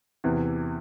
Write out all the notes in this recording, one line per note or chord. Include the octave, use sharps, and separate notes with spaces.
E2 C3 E3